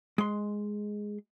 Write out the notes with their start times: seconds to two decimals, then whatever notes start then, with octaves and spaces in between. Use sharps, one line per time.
0.18 G#3 C6